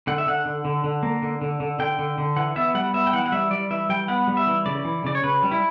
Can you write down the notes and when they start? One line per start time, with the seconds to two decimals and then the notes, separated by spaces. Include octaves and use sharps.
0.07 D3 F#5
0.18 E5
0.27 D3 F#5
0.46 D3
0.65 D3
0.84 D3
1.03 A#3
1.22 D3
1.42 D3
1.60 D3
1.79 D3 G5
1.99 D3
2.18 D3
2.36 E3 F#5
2.56 B3 E5
2.74 G3 F#5
2.94 B3 E5
3.07 G5
3.13 E3 F#5
3.26 F#5
3.32 G3 E5
3.51 G3 D5
3.70 E3 E5
3.90 G3 G5
4.08 B3 F#5
4.28 G3
4.37 E5
4.47 E3
4.66 C#3 D5
4.85 E3
5.04 C#3 D5
5.15 C#5
5.24 C#3 B4
5.43 G3
5.51 E4